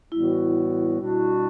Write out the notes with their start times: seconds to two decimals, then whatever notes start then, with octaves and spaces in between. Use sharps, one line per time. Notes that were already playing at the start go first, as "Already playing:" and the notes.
0.11 A2 E3 G3 B3 E4 F#4
0.99 B2 G3 D4 F#4